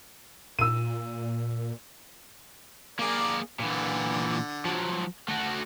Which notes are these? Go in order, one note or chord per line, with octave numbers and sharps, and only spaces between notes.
A#2 E6 D#7
A#3 G#4 A#4 D5
A#2 D3 E3
F3 F#3
A3 F#4